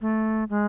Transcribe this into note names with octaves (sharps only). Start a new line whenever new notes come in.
A3
G#3